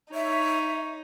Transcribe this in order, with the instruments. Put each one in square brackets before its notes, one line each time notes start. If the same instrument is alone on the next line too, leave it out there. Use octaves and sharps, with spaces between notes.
[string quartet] D#4 [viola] C#5 [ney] E5